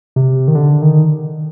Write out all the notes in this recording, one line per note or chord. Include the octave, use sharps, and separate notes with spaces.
C3
D#3
D3
D#3